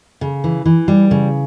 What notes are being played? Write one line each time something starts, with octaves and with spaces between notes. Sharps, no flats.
C#3
E3
E3
G3
C#3